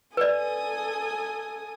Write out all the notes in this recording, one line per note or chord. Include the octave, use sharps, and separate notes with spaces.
A4 B4 D5 G#5 D#6